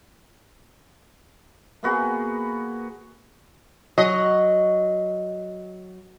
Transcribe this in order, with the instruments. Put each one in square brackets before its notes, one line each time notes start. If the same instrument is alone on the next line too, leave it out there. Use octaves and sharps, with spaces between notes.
[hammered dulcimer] A#3 B3 F#4 G#4
[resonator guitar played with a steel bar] F#3 [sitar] D#5